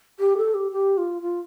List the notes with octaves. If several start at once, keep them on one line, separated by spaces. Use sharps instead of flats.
G4
A4
G4
G4
F4
F4